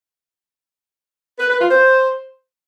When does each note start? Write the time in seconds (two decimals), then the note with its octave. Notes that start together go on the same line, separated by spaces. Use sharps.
1.39 B4
1.49 B4
1.60 F4
1.70 C5